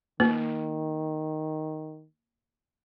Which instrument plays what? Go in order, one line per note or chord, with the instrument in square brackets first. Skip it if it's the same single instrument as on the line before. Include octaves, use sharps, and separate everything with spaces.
[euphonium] D#3 [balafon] A#3